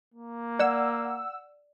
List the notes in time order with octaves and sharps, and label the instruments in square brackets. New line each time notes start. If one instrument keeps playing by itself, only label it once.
[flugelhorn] A#3
[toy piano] D5 [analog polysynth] F#5 E6